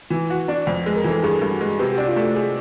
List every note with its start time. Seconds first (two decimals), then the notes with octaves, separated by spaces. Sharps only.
0.10 E3
0.30 F#4
0.48 D4
0.67 F2
0.86 G#3
0.96 A#4
1.04 E3
1.10 A4
1.23 G2 G#4
1.42 G2
1.51 F#4
1.61 G#3
1.79 C3 G4
1.89 F#4
1.94 D4 G4
2.08 F4
2.16 A3
2.22 F#4
2.36 G#4